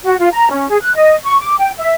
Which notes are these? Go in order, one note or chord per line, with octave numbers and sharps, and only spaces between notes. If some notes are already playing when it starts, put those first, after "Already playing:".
F#4
F4
A#5
C#4
G#4
F#6
D#5
C#6
D6
G5
E5